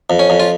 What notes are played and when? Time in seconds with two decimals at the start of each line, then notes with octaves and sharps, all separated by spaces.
0.10 F2
0.19 C#4
0.30 F2
0.40 F4